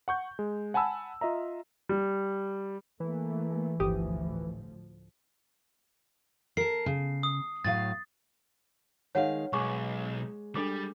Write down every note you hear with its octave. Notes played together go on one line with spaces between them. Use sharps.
F#5 C#6 G6
G#3
F#5 G#5 A5 B5 E6
F4 D#5 E5 A#5
G3
E3 A3 A#3
G1 D2 A2 F3 G4 D#6
A#4 A5 C7
C#3
D#6
A2 F#3 F5 A6
D#3 G#3 C#5 F5 F#5
B1 G#3 C#6 D6
G3 D4 A4 D6